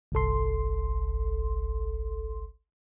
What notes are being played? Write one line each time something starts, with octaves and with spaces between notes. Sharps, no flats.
G1 C2 A4 C6